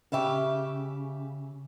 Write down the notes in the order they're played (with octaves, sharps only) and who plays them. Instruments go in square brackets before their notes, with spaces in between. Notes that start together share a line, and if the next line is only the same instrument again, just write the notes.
[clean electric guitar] C#3 [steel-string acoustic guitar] G4 E5 F5